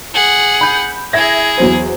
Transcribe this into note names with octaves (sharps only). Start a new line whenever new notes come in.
G#4 F#5
B5 G6
E4 G#4 E5 G#6 A#6
E2 F#3 C5